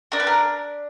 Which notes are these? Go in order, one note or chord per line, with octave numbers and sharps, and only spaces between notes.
D4 A#4
B4
A#4